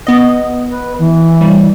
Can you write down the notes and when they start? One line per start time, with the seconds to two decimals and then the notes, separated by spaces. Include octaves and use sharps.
0.07 B3 D#5
0.69 B4
0.98 E3
1.41 G3